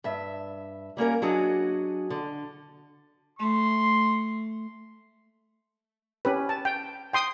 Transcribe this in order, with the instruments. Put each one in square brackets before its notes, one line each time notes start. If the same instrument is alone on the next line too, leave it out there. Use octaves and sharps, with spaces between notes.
[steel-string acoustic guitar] G2 E5
G3 A#3 C#4 A#4
F#3 D4 F#4 G#4 D#5
D3
[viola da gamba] A3 [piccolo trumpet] C6
[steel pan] C#4 G4 B4
A5
G5
G5 C6 D#6